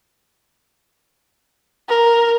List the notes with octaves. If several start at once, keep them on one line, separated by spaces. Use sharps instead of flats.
A#4